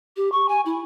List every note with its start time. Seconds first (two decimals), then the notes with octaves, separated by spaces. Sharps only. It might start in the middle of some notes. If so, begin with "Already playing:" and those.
0.17 G4
0.32 C#6
0.49 G#5
0.66 E4